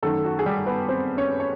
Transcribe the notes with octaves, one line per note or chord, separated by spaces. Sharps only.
F#2 D#3 F#3 A3 A4
F#4
G#4
G3 G4
B3 B4
C4 C5
C#4 C#5
C#5